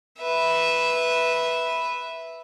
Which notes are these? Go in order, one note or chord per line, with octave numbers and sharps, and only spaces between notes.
B4 E5